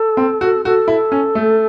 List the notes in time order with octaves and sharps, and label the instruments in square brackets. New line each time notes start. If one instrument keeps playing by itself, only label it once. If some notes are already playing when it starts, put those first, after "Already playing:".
Already playing: [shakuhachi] A4
[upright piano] C4
F#4
[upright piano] F#4 [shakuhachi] A4
[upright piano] E4
C#4
A3